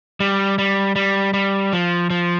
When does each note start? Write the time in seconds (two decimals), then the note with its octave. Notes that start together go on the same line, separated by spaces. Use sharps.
0.20 G3
0.58 G3
0.96 G3
1.34 G3
1.73 F3
2.10 F3